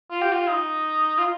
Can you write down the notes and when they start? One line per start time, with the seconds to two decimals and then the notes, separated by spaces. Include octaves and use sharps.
0.11 F4
0.22 G4
0.33 F4
0.48 D#4
1.18 F4